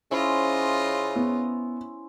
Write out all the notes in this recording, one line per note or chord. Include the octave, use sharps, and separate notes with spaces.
C#3 C#4 E4 F4 C5 D#5
B3